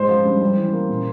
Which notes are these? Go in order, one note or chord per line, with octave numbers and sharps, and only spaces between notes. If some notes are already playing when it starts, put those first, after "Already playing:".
Already playing: G#2 G#3 C5
F3
G2
G3
E3
A#3
A#2